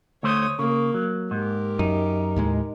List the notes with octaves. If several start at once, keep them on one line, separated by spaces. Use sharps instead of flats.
D2 A3 C5 C#5 D#6
C#3 A#3
F#3
G#2 G4 A#4
F#2 D#4
D#2 A2 G#3